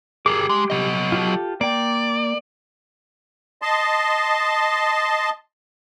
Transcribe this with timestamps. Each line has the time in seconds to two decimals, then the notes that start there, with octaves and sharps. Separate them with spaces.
0.26 G4 G#4 A#4 D6
0.49 G#3
0.70 F#3 D#5
1.12 F4 G4 A4
1.61 A#3 D5 G5
3.62 D#5 A5 C6